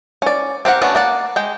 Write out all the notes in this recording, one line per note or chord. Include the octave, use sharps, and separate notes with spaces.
C#4 D5
C4 G4 A#4 F#5
A3 B3 C#4 D4 F#4
A#3 D5 F#5
G#3 G5